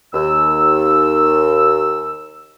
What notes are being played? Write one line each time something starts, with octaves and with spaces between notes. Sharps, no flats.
D#2 E6